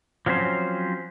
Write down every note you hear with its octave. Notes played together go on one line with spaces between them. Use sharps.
F3 F#3 C4 C#4 C5